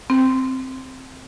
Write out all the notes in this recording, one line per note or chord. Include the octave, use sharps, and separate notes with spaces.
C4